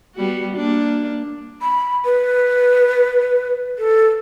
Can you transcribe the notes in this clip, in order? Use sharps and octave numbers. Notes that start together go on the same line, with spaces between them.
G3 B3 F#4
A#3 D4
B5
B4
A4